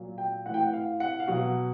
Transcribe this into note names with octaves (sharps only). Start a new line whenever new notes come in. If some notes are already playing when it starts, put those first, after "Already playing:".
Already playing: A#2 F#3
G5
A2 E3 F#5
G5
F#5
F5
F#5
F5
B2 F#3 F#5